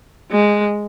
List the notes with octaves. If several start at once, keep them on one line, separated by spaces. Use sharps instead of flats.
G#3